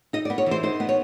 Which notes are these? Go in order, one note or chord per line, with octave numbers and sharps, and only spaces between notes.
D#4 D#5
D5
B3
C#5
E3 C5
D#4 C5
B3
C#5